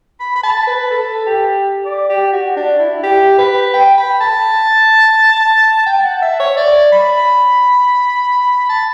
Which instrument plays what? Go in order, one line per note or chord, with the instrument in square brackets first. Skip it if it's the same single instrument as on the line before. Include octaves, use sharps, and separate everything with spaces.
[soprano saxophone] B5
B5
A5
B4
A4
G4
D5
G4
F#4
D4
E4
G4
B4
G5
B5
A5
G5
F#5
E5
C#5
D5
B5
A5